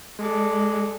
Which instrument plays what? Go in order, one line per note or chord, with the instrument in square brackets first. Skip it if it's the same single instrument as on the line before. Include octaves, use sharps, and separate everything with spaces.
[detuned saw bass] G#3 [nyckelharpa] A4 D5